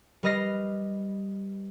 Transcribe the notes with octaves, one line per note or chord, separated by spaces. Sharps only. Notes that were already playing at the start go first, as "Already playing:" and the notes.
G3 B4 D#5 F6 A#6 C7